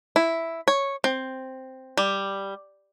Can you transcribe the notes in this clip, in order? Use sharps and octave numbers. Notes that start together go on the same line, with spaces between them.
E4
C#5
C4
G3